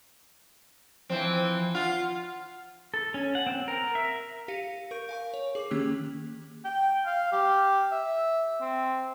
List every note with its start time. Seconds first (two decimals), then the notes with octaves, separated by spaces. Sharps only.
1.10 E3 F3 C4
1.75 F4 F#5
2.94 A4
3.14 C#4
3.35 F#5
3.47 C4
3.68 A#4
3.95 E5
4.48 G4 F5 A#6 C#7 D#7
4.91 A#4 C#6 G6 D7
5.09 F5 G#5 C#6
5.34 C#5
5.55 G#4 D6
5.71 D#3 A#3 C#4 G4 E6 F#6
6.65 G5
7.06 F5
7.32 G4
7.92 E5
8.61 C4